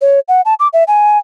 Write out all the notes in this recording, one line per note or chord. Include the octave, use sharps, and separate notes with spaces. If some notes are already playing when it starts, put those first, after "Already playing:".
C#5
F#5
A5
D6
E5
G#5